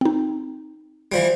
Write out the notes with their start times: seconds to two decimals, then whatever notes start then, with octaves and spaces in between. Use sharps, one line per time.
0.01 C4 D#4
1.12 E3 F3 G3